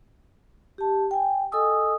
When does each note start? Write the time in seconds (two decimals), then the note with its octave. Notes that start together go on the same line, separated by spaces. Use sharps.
0.78 G4 A5
1.11 G5 G#5
1.52 A4 D#5 G#5 D#6 E6